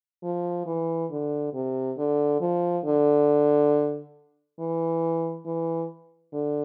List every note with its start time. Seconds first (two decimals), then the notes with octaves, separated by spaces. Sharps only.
0.23 F3
0.66 E3
1.10 D3
1.53 C3
1.97 D3
2.40 F3
2.84 D3
4.59 E3
5.46 E3
6.33 D3